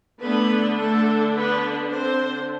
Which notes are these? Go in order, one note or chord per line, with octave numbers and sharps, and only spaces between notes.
D3 A3 B3 D4 B4
A3 A4
B3 B4
C4 C5